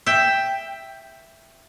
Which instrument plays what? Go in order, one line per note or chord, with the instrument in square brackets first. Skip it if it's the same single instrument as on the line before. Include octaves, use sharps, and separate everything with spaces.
[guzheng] E5 G5